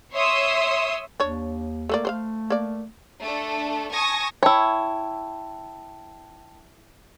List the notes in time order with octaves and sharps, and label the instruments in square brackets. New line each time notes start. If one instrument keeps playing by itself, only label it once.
[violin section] C#5 E5 C6 D#6 E6
[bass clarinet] D#2 [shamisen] D4 C#5
[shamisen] A3 A#3 D5
[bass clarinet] A3 [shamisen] C5 D5 F5
[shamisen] A#3 D5
[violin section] A3 D4 A4
G#5 A5 C#6 D#6 G#6 A#6
[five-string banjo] E4 C#5 [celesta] G5 A5 E6